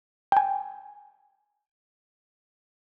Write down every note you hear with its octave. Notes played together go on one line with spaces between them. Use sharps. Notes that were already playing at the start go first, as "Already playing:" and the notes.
G5 G#5